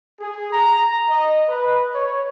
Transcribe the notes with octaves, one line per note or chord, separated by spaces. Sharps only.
G#4
A#5
D#5
B4
C#5